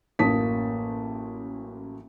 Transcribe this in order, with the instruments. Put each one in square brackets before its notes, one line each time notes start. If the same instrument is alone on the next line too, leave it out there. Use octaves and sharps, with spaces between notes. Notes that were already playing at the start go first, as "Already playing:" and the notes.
[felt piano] A1 F#2 A#3 A5 D#6 B6